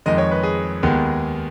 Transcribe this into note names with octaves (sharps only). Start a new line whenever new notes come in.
F2 D#3 G#3 D#5
C#5
B4
G#4
D#2 D#3 G#3 B3